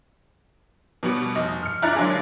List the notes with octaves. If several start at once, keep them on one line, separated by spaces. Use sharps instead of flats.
B2 G3 B3
F1 D#5
F6 C#7
G2 D4 E4 A#5 F#6 A6
D3 F#3 G#3 A#3 D4 G#4